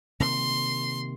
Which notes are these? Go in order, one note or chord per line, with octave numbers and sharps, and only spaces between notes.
C3 D#3 A#3 C6